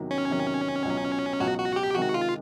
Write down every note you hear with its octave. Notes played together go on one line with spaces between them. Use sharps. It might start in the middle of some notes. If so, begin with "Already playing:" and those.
Already playing: E2 C3 D#3 F#3
C#4
E2 C3 D#3 F#3
C#2 B2 F#3
C#2 B2 F#3 F#4
F#4
G4
C3 D#3 G#3 F#4
F4